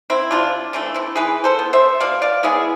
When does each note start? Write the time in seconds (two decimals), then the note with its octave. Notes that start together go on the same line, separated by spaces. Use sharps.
0.10 C4 E4
0.31 C3 D4 F4
0.73 E3 A3 D4
0.94 C4 E4
1.16 E3 G#4 B4
1.44 A4 C5
1.59 B3
1.73 C5 E5
2.00 B2 D5 F5
2.22 D5 F5
2.43 G#3 B3 E4 G#4